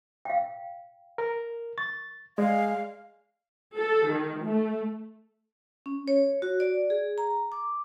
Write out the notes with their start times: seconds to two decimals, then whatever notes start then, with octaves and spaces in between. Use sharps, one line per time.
0.25 F5 G5
1.18 A#4
1.78 C#6 A6
2.38 G#3 D5 F5
3.77 A4
4.10 D#3
4.43 A3
5.86 C#4
6.08 C#5
6.42 F#4
6.60 D5
6.90 G#4
7.18 A#5
7.52 D6